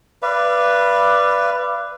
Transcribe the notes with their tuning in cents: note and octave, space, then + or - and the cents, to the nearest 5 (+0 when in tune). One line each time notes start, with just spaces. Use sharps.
B4 +0 D5 +0 F5 -35